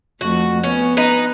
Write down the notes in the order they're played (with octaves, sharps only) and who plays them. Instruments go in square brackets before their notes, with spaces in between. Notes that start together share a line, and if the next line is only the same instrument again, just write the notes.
[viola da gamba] F2 A3 [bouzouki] F#4
[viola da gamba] B3 [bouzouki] C#4
[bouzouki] D#4 B4